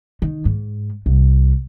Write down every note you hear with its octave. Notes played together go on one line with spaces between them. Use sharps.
D#3
G#2
C2